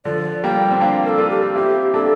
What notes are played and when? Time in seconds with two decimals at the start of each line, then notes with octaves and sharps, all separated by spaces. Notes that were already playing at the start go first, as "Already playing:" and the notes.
0.05 D3 F3 D5
0.44 G3 A#3 G5
0.71 C4
0.80 A#3 D4 F5
1.05 A#4
1.09 A4
1.18 D4 F4
1.30 G4
1.55 C4 E4 G4
1.94 A#3 D4 A4